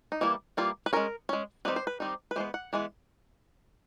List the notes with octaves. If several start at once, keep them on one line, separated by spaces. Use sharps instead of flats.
D#4
E3 G3 A#3 E4
E3 G3 A#3 F4
B4
G#3 C#4 A#4
G#3 C#4
D#3 G3 C4 D#4 B4
C5
B4
D#3 G3 C4 D#4
B4
E3 G#3 B3 C5
F#5
E3 G#3 B3